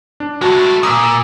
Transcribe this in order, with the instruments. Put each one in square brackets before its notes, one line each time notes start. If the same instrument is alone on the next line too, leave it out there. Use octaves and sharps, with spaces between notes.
[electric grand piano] D4
[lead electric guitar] G#3 A3 [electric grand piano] F#4 A5 B5
[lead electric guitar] A#2 [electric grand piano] D#6 E6